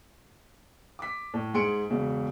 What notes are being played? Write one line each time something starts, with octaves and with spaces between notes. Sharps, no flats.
D6 B6
A2
G#2 G#4 C6 C#7 D7
E1 C#3